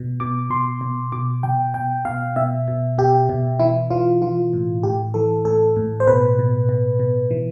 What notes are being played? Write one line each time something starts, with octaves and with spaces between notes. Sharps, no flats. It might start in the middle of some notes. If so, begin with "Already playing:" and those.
Already playing: B2
B2 D6
B2 C6
B2
B2 D6
B2 G5
B2 G5
B2 F5
B2 E5
B2
B2 G4
B2
E3 E4
E3 F4
E3 F4
A2
A2 G4
E3 A4
A2 A4
A2
C5
B2 B4
B2
B2
B2
E3